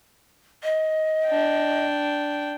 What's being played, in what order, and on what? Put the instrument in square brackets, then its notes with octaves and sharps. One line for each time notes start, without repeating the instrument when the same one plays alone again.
[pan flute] D#5
[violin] D4 G5